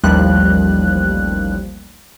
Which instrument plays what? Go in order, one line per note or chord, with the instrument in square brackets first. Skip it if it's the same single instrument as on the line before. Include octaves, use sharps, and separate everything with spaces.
[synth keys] A1 D#2 F3 G3 F#6